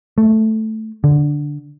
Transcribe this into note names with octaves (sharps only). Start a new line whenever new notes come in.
A3
D3